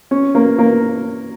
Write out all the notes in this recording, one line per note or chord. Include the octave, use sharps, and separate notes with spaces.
C#4
A#3
A#3